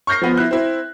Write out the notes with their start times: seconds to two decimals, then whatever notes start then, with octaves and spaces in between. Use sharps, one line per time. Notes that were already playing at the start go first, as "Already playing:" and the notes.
0.07 C#6 F6 G6 A#6 C7
0.22 F3 B3
0.37 E4 F#6
0.51 C4 E4